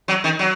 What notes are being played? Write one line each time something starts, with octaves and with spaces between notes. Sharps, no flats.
F#3
D#3
F#3